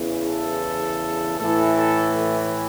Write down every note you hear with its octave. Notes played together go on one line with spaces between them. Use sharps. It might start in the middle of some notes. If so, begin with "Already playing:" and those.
Already playing: E2 C#3 E3
A4
A2 E3 A4
A4